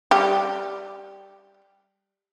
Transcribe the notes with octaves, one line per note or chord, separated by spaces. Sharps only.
G3 G4